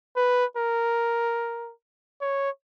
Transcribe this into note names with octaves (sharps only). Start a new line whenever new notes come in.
B4
A#4
C#5